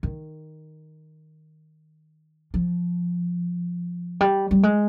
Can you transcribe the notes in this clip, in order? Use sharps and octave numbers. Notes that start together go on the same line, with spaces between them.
D#3
F3
G3
G3
G#3